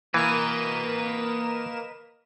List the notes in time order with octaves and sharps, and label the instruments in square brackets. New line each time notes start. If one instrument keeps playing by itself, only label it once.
[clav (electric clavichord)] E3 [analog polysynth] A#3 A#4 E7 [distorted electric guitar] B4 D#5